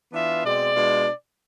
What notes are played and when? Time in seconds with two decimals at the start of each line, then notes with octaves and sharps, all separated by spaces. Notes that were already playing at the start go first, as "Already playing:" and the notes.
0.12 E3 B3 D4 F4 E5
0.44 B2 G#3 C4 D5
0.75 B2 G#3 D4 F4